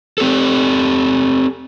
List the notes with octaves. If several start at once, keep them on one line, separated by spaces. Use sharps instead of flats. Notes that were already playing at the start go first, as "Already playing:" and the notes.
C4 G4 A4